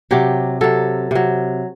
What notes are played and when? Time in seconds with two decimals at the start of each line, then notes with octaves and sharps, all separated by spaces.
0.11 C3 F#3 G4
0.61 C3 F#3 A4
1.11 C3 F#3